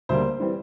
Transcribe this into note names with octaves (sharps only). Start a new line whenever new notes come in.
D2 D3 G3 A#3 C5
E3 G3 C4